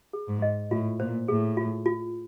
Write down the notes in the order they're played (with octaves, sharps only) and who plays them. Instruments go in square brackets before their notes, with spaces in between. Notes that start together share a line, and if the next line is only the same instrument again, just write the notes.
[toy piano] G#4
[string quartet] G#2
[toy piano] D#5
[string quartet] A2 [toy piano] F4
[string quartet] A#2 [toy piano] C5
[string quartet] A2 [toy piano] G#4
[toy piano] F4
F4